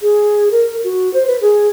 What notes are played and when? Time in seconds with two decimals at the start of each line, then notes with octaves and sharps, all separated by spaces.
0.01 G#4
0.51 A#4
0.84 F#4
1.13 C5
1.27 B4
1.41 G#4